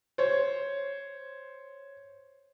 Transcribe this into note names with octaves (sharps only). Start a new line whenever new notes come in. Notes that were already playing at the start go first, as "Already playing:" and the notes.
C5 C#5